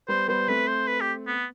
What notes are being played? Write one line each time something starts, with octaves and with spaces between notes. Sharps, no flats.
G3 B3 C5
G3 B3 C5
A3 C4 B4
C5
B4
G4
B3